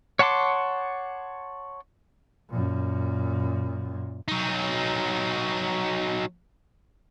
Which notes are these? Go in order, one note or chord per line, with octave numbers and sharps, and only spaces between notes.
C#5 F#5 A5 C6 D6
F#2 A#2
F#3 D#4